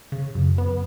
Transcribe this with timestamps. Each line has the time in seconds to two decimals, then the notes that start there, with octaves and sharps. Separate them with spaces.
0.12 C#3
0.35 F#2
0.58 B3